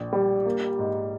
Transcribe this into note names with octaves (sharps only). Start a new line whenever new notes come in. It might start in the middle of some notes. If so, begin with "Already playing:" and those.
Already playing: A#1
G3
A#3
G#2